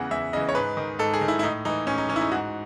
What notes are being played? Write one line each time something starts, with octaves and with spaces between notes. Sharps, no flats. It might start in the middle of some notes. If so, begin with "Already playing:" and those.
Already playing: E2 C#3 E3 F#5
E2 E5
C#3 E3 D#5
C#5
G#2 B4
D#3
G#2 A4
G#4
D#3
E4
E4
A2 D#4
E3 D#4
A2 C#4
D#4
E3 C#4
E4
D#4
G#2 F#4